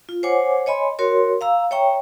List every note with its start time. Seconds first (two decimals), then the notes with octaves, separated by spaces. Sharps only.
0.09 F4
0.23 C5 C#5 F#5 G#5 D6
0.66 C#5 D#5 G#5 B5 C6
0.99 F#4 A#4 C#5 C6
1.41 F5 A#5 E6
1.71 C#5 E5 G5 A#5 C#6